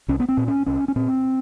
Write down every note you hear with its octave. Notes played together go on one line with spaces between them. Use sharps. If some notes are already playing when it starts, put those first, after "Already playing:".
C2 C#4
B3
C4
A#2
C#4
C2 C#4
C#4
A#2 C4